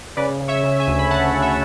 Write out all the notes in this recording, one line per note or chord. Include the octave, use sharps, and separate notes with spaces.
C#3 B4 D5
C#3
C#5 E5
C#3
E5 G#5
D2
B5
D2 F#5 A5
C#3
C#5 E5